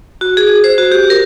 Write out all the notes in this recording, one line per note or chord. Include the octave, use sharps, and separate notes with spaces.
F#4
G#4
C5
F#4
G4
A#4